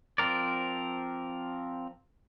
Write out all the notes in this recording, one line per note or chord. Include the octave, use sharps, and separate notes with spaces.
F3 C4 A#4 D5